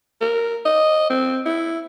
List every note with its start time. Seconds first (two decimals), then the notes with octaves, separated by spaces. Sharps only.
0.22 A#4
0.65 D#5
1.10 C4
1.46 E4